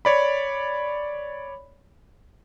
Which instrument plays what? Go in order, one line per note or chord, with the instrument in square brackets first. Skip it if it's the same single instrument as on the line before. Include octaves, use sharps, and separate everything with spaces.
[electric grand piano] C#5 D5 B5